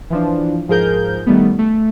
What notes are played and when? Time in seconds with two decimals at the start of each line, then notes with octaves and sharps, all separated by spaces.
0.10 E3 F3 D4
0.68 G#2 F3 G#4 A#4 G6
1.26 D#3 G3 A3 B3
1.59 A3